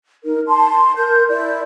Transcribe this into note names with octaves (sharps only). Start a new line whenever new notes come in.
D#4 A#4
A5 C6
A#4 G6
E4 D5